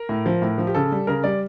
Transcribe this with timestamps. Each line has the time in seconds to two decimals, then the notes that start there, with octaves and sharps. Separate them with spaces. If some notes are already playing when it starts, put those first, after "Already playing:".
Already playing: A#4
0.09 A2
0.26 F3
0.42 A2
0.58 F3
0.67 G4
0.75 C#3 A4
0.92 G3
1.07 C#3 A#4
1.24 G3 D5